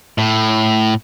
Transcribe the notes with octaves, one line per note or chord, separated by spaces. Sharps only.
A2